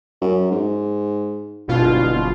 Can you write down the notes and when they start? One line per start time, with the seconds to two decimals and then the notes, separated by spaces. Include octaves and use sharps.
0.22 F#2
0.52 G#2
1.68 D1 G1 B2 F4